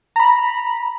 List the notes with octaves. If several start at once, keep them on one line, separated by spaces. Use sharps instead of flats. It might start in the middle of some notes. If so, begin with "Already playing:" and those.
A#5 B5